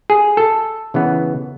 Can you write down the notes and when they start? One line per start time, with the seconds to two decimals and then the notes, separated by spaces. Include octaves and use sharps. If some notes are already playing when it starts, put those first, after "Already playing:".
0.10 G#4
0.37 A4
0.94 C#3 E3 B3